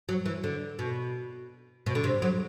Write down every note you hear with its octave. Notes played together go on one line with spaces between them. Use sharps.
F#3
E3
D3
B2
B2
D3
C3
F#3